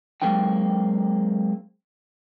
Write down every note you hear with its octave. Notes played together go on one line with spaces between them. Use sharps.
F#3 G#3 A#3 C4 D#4 G5